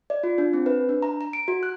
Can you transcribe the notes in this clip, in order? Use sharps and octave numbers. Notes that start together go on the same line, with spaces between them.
D5
F4
D4
C4
B4
D4
A#5
A#5
D7
F#4
F#6